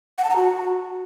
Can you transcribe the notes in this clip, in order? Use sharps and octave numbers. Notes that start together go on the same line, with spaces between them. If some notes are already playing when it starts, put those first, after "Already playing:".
F#5
A5
A#5
F#4